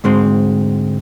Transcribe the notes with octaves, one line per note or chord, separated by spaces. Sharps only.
D2 G#2 G#3 C4